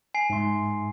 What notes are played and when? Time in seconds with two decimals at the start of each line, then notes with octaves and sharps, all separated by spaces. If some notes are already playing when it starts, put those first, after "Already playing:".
0.14 G#5 C7
0.30 G#2 E5 C6